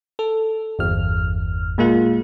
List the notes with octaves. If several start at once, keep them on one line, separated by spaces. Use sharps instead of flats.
A4
G1 E2 F6
A#2 G#3 A#3 F4